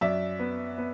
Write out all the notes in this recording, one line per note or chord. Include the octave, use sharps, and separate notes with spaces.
F#2 D5 E5
B3
B3